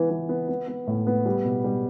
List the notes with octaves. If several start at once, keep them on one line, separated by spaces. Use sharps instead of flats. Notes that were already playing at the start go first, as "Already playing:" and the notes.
Already playing: E3 B3
E3
B3
B3
B3
A2
B3
G3
B2
G3